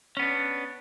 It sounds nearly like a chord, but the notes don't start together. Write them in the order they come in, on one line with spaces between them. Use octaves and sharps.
C#4 B3 D4